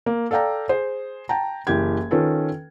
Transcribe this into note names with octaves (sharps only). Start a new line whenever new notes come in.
A#3
A4 D5 F5 G5 A#5
G#4 C5
G5 A5 A#5
F#1 E3 G4 G5 G#6
D#3 C#4 F4 A4 B4